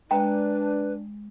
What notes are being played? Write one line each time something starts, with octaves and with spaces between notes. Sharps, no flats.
G#3 D4 B4 G5 A#5